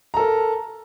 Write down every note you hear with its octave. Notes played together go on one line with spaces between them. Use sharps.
A4 A#4 A#5